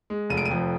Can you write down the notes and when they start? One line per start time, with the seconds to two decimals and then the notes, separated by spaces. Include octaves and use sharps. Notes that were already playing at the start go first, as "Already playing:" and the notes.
0.10 G#3
0.30 F1 D#7
0.37 D7
0.45 F2 D#7